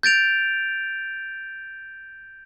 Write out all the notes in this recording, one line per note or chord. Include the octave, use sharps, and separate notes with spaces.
G6 A6 D7 F7